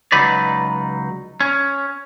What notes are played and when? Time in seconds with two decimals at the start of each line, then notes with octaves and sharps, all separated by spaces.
0.12 C#2 F#3 D#4 B4 D5
1.40 C#4